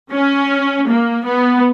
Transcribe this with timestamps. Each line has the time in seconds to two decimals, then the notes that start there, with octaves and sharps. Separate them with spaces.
0.12 C#4
0.88 A#3
1.26 B3